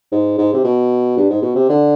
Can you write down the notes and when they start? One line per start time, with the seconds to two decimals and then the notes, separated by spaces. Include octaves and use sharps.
0.12 G#2
0.38 G#2
0.54 C3
0.64 B2
1.17 G2
1.30 G#2
1.42 B2
1.55 C3
1.69 D3